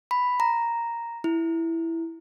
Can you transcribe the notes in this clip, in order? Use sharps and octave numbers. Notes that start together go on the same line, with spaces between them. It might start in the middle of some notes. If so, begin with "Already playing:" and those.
B5
A#5
E4